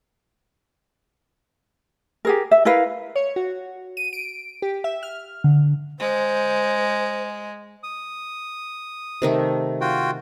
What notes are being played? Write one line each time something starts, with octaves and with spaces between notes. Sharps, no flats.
G4 G#4 A#4
E5
E4 A#4 B4 F5
C#5
F#4
D#7
D7
G4
E5
F6
D3
G#3 C5
D#6
C3 D#3 A3
F4 F#4 G5